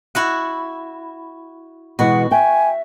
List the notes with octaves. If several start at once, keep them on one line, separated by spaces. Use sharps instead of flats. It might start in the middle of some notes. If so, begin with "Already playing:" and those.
E4 F#4 F#5
B2 E3 G#3 F#4 F#5
E5 G5 G#5